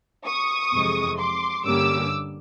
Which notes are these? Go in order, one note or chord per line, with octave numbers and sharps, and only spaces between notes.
C#6 D#6
F2 C3 E3 G#3
C6 D6
G2 D3 G3 A#3 C#4 D6 E6